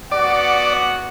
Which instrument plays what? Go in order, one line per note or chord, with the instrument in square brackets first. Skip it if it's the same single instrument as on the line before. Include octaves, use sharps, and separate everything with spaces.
[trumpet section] B3 F#4 F#5 [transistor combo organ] D5